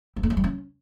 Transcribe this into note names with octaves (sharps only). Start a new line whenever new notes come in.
G3
A3
G#3
G3
C#4